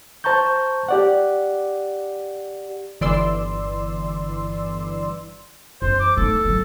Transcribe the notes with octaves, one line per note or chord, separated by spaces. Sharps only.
C5 A5 A#5 C#6 G6
G4 D5 F#5
G1 E3 D5 C6 E6
F#2 E3 C5
D6
A3 D#4 A4
D#3 F#3